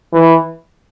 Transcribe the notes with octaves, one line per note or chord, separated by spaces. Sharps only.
E3